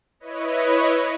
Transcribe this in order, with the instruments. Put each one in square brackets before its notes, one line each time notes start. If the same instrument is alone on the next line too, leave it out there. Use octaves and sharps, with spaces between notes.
[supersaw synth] E4 B4 C#5 D#5